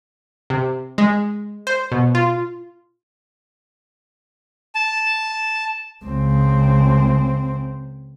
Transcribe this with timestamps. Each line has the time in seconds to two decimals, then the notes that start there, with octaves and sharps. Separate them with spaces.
0.50 C3
0.98 G#3
1.67 C5
1.92 B2
2.15 F4
4.75 A5
6.05 C#2 C4